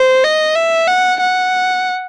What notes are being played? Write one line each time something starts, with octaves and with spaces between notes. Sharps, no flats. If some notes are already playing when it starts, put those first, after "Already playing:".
Already playing: C5
D#5
E5
F#5
F#5